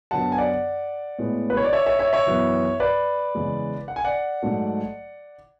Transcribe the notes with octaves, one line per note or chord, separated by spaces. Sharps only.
F#2 D3 F#3 B3 F#5 A5
G#5
D5 F#5
A2 G#3 B3
B4
C#5
D5
C#5 E5
C#5 E5
C#5 E5
C#5 E5
F#2 E3 B3
B4 D5
E2 C#3 G#3
F#5
G#5
D5 F#5
G#2 F#3 A3